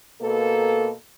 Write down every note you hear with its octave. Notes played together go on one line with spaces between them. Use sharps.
B2 A#3 A4